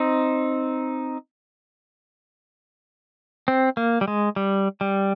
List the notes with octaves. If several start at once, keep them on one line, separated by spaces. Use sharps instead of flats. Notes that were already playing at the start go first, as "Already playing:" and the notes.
Already playing: C4 D#4
C4
A#3
G3
G#3
G3
G3